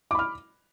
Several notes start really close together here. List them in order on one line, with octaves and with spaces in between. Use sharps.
D6 B5 F6